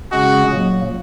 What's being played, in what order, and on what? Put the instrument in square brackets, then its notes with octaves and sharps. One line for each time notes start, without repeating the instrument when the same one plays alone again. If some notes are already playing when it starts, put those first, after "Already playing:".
[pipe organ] C#3 G#3 C#4 G#4 [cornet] F#4
[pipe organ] A#2 F#3 A#3